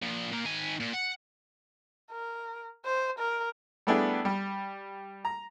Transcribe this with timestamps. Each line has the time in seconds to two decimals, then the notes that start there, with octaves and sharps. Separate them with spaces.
0.02 A#2 F3
0.32 A#2 A#3
0.46 D#3 G#5
0.80 A#2
0.93 F#5
2.11 A#4
2.86 C5
3.19 A#4
3.87 G3 A3 B3 D4 E4 G#4
4.25 G3
5.25 A#5